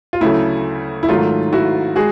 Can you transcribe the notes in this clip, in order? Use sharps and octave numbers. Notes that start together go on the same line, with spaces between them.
F4
D2 C#3 F#3 A3 E4
E4
G#2 D#3 F#3 A3 F4
E4 F#4
G#3 F#4 G#4